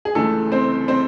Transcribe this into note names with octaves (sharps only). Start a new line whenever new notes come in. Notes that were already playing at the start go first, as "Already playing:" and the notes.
G#4
C#2 C#3 E3 A3 A4
C4 C5
C4 C5